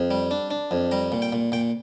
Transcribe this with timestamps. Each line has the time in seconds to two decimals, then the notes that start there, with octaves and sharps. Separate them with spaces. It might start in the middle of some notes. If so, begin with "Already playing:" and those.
Already playing: F2
0.11 G3
0.31 D4
0.51 D4
0.71 F2
0.91 G3 A#5
1.12 A#2
1.22 G5
1.32 A#2
1.52 A#2 G5